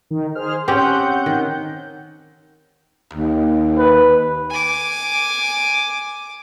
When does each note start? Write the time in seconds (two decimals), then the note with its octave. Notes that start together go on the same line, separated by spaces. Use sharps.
0.11 D#3
0.35 G#4 C5 F6
0.68 C4 C#4 G4 C#5 F#5 G5 G6
1.26 D#3
3.13 D#2
3.78 B4
4.50 G#5 D6